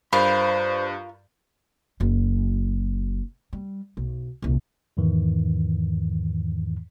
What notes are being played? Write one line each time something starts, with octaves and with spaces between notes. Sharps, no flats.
G2 F4 A#4 C5 B5
F#1 F#3
G3
B1
D#1 C2
E2 G#2 D#3 E3